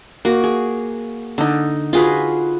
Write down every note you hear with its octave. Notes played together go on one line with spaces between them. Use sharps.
A#3 F#4
G#4
D3 D#4
F4 F#4 G#4 B4